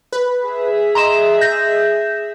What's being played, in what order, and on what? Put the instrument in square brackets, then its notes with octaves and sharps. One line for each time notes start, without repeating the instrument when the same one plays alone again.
[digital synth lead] B4
[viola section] G#4 E5
[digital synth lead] D#5 [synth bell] A#5 C6 E7
[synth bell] G6 A#6